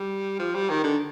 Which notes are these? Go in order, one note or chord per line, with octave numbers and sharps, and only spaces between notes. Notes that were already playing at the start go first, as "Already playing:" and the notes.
Already playing: G3
F3
G3
D#3
D3